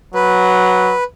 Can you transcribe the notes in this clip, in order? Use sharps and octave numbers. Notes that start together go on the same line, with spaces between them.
F#3 B4